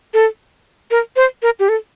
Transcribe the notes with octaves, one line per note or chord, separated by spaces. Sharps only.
A4
A#4
C5
A#4
G4
A4